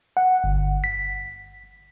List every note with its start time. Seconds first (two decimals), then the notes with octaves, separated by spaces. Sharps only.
0.17 F#5
0.44 G1
0.84 B6